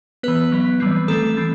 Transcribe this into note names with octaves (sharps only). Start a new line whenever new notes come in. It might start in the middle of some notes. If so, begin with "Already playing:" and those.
E3 B3 B4
F#3 B3
E3 G3 C4
D#3 A3 C4 A4
E3 A3 C4